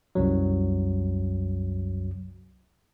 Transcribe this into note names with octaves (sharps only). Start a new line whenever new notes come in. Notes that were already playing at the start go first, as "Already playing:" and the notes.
C2 F#2 F#3